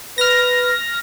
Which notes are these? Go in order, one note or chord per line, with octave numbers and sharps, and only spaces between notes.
B4 F6 A#6